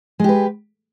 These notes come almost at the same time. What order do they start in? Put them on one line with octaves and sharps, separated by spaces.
G#3 G4 B4